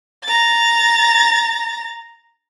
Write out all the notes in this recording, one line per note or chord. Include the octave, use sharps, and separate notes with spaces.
A#5 A6